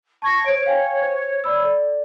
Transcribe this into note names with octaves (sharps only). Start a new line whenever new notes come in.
A5 C#6 G#6 A#6
C5 C#5 D7
F5 G5 G#5
C5
D5 B5 E6
A4 D5